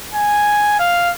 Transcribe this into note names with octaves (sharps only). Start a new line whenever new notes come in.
G#5
F5